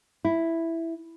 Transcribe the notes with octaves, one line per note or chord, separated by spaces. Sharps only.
E4